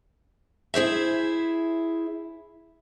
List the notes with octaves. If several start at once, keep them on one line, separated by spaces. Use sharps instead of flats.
E4 G#4 C5 E5